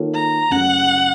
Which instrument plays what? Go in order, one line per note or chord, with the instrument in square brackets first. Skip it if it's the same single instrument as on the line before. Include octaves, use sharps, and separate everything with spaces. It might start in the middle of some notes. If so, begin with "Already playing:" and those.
Already playing: [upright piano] D#3 A#3 F4 A4 C#5
[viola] A#5
[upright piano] F#1 F#2 C#3 A3 C#4 [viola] F#5